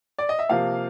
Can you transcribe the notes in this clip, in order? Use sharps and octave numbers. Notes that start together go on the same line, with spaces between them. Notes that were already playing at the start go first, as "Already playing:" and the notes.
D5
D#5
E5
C3 F3 A#3 F5